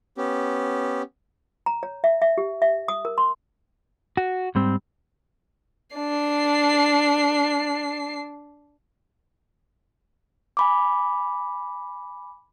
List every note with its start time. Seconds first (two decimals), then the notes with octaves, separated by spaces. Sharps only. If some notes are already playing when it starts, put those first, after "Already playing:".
0.18 B3 C#4 G4
1.66 A#5
1.83 C#5
2.04 E5
2.22 E5
2.38 G4
2.62 E5
2.88 D#6
3.05 A#4
3.18 C6
4.17 F#4
4.55 G#2 G3 C4
5.96 D4 C7
10.57 G#5 B5 D6